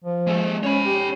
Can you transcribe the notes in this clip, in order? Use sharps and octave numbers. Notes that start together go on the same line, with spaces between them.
F3
G#3 A4
C#4 C#5 B5
G4